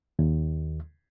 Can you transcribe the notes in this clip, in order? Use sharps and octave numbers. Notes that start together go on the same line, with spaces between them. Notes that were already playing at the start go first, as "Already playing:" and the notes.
D#2